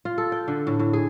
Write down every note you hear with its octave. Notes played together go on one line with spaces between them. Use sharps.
F4
A4
G5
D3
A2
A2
G#4